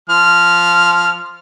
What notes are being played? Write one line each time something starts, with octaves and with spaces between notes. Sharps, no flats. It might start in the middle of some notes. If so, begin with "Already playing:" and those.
F3 F6